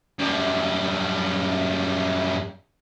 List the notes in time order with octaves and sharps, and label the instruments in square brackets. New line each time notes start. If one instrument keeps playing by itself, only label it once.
[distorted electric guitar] F#2 G3